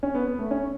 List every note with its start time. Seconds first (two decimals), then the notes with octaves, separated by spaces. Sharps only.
0.03 C#4
0.15 B3
0.27 B3
0.39 A3
0.51 C#4